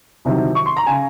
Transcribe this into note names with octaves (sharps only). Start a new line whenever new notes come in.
C2 C3 D#3 F#3
C#6
C6
A#5
C#3 G#5